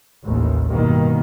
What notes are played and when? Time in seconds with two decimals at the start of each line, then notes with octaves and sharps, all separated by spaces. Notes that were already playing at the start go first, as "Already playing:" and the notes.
0.23 A1 D#2
0.69 G2 B2 D#3 A#3